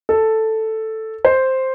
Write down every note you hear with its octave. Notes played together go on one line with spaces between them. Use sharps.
A4
C5